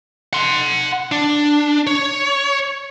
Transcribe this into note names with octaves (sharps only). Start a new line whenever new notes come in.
F#5 C6
D4
C#5